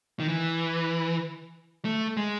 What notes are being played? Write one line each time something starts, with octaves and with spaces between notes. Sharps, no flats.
D#3
E3
A3
G#3